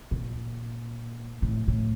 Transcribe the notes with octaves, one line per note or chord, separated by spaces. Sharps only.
A#2
A2
A2